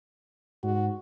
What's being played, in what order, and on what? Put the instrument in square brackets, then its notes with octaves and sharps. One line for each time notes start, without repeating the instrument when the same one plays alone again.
[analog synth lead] G#2 [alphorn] F#4